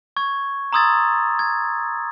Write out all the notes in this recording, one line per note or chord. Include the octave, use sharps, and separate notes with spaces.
C#6 G#6
A#5 C6 D#6 E6 G#6 A6
G#6